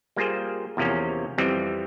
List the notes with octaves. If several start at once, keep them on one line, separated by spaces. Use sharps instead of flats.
G3 A#3 F4 G#4 C5
E2 C3 F3 A#3 C#4
F2 E3 G3 C4